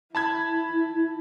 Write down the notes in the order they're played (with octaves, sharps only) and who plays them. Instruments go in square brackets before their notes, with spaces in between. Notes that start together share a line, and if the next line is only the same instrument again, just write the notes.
[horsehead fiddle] E4 [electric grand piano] A5 B5 G#6